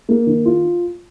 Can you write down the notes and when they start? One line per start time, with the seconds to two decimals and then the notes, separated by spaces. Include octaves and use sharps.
0.09 A#3
0.27 D#3
0.45 F4